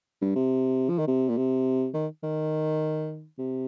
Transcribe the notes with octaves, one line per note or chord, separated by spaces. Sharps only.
G2
C3
F3
D#3
C3
A#2
C3
D#3
D#3
C3